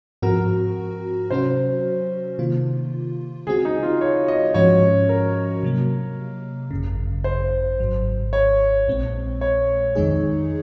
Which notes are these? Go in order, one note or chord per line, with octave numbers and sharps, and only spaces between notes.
G#2 F3 C4 F#4 A#4
C3 F#3 C#4 F#4 C5
C3 D#3 A#3 F4
C#3 G#3 C4 F#4 G#4
D#4
F4
C#5
D#5
G#2 F3 G#3 C#4 F#4 C#5
A#4
C3 F#3 A#3
G#1 F#2 C#3
C5
G#1 G#2 F#3
C#5
A#1 A#2 G#3 C4
C#5
F2 D#3 G#3 D#4 G#4